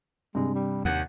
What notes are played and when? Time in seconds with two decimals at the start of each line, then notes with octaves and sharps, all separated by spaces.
0.35 G2 C3 G#3
0.55 G3
0.85 D#2 F#5